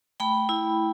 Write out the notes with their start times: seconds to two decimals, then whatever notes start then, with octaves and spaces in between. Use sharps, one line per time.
0.20 A3 G5 B5
0.49 E4